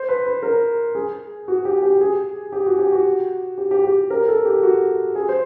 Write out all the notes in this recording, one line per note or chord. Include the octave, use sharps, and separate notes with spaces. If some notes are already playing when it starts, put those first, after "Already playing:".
Already playing: C5
B4
B4
A#4
G#4
F#4
G4
G4
G#4
G4
F#4
G4
F#4
G4
G4
G4
A#4
A4
G4
F#4
G#4
C5